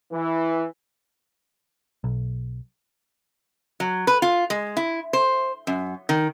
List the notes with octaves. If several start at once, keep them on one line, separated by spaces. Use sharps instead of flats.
E3
B1
F#3
B4
F4
G#3
E4
C5
F#2
D#3